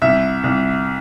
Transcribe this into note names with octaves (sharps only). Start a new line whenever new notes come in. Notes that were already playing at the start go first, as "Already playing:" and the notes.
C2 E5
C2